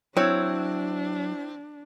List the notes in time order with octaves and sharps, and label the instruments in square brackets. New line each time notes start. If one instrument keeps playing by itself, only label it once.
[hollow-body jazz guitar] F#3 [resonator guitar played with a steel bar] C4 [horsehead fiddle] D4 [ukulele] E4 C#5